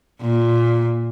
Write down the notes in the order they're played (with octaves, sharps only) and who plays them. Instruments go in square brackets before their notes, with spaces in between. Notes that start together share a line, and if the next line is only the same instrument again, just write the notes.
[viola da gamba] A#2